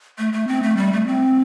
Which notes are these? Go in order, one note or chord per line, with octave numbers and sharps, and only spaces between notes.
A3
A3
C4
A3
G3
A3
C4